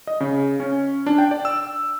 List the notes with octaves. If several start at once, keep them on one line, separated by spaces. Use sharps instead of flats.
D#5
C#3
C#4
D4
G5
D5
E6